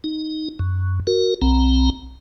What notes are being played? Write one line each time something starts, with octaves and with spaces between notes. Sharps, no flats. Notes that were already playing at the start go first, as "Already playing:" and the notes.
D#4
F#2
F#4 A#4
B1 C4 A#5